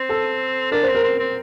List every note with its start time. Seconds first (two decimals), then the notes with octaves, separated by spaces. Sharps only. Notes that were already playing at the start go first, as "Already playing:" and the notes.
Already playing: C4
0.09 A4
0.72 D4 A#4
0.83 C5
0.88 C4
0.95 A#4
1.03 C4
1.20 C4